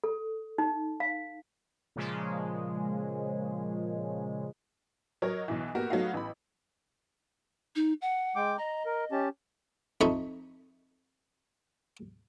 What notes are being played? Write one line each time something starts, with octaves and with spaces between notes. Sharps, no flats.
A4
D#4
F5
A#2 C#3 F3 G#3
F#3 A#4 C#5 D#5
B1 B2 E3
A#3 B3 F#4 G4 A#4
F#3 A3 B3 D#4 F#4 F5
A1 B5
D#4
F#5
G#3 G5 D6
D#5 A#5
A#4
C#4 G4 A5
F2 D#4 A4 E5 B5 C#6